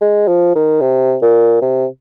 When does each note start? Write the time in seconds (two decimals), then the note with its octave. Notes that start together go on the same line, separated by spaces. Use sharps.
0.01 G#3
0.28 F3
0.55 D#3
0.81 C3
1.22 A#2
1.62 C3